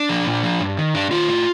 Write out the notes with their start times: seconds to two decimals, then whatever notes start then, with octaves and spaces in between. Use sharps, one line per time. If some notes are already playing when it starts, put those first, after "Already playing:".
Already playing: D4
0.09 F3
0.26 A#2
0.43 F3
0.60 G2
0.78 D#3
0.94 G2 D4
1.11 D#3 F4
1.28 A2